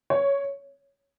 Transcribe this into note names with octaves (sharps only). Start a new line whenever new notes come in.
C#5